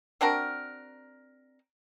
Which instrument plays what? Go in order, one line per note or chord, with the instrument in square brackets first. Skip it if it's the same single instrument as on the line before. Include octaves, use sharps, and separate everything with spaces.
[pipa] C4 D4 F#4 A#4